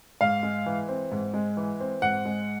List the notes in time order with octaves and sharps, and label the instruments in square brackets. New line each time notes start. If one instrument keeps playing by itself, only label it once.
[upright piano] G#2 F5
G#3
E3
C4
G#2
G#3
E3
C4
G#2 F#5
G#3